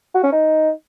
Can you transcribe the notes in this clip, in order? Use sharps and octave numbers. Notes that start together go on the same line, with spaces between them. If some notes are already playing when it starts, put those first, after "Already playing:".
F#4
C#4
D#4